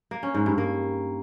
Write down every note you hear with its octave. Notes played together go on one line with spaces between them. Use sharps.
A#3
C#4
G#2
G2
A#3